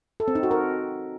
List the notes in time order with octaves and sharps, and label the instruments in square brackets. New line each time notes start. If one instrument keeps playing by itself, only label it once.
[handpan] A4
C4
D#4
F#4
A#4